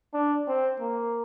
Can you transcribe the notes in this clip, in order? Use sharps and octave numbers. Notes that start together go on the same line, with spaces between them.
D4
C4
A#3